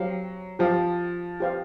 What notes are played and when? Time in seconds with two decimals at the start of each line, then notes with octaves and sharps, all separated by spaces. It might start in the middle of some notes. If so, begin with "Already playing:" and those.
Already playing: F#3 G4 C5 F5
0.59 F3 G4 C5 F5
1.40 G4 C5 F5